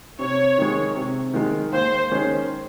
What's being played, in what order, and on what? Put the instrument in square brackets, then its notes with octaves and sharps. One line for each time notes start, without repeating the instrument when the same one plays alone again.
[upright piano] C3 [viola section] C#5
[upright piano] D#3 G#3
C3
D#3 G#3
[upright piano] D#2 [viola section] C5
[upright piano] D#3 G#3 C#4